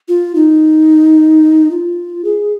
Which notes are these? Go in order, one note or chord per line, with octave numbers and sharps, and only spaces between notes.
F4
D#4
F4
G#4